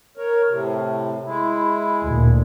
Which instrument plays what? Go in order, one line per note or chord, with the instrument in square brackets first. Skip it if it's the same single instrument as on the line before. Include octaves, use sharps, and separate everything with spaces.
[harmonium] A#4 C#5
A2 C3
G#3 E4
[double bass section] D2 A#2